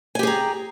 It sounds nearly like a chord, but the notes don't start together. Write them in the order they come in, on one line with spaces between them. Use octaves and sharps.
G#5 G4 G#4 A#5